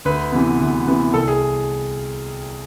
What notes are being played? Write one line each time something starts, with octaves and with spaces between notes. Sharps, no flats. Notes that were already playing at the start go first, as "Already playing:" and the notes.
D2 B4
C3 E3 B3
D2
C3 E3 B3
C2 A4
G#4